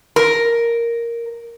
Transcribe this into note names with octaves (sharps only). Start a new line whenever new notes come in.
A#4